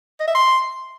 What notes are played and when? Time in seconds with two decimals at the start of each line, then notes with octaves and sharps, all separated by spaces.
0.20 D#5
0.27 E5
0.35 C6